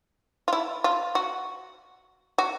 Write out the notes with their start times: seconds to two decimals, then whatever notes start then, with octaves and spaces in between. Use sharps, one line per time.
0.48 F4
0.53 E4
0.84 F4
1.15 F#4
2.38 F#4